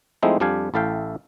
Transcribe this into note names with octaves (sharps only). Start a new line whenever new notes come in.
F3 G#3 A3 C4 D#4 E4
F2 G3 D4 G4 F5 G#5
A1 E4 A4 E5 F5 G5